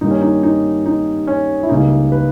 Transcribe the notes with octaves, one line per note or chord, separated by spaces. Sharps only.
G2 D#3 G3 A#3 D#4
C#4
D#4
D#4
D#4
C#4
E4
C#2 C#3 G3 A#3 D#4
B4